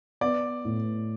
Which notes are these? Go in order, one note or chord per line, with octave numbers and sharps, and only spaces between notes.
B3 D5
A2